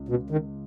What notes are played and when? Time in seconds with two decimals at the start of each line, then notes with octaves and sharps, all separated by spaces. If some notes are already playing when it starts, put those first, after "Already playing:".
Already playing: C#2
0.09 B2
0.30 D#3